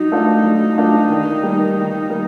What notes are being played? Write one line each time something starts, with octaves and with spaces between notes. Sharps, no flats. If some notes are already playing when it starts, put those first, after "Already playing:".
Already playing: F#3 D#4
A3 D4 F4
F#3
A3 D4 F4
D#3
G3 A#3
D#3
G3 A#3